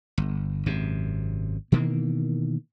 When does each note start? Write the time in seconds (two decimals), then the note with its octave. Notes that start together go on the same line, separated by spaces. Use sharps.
0.18 G1
0.66 G#1 F#2 C3
1.72 B2 D#3 E3 A#3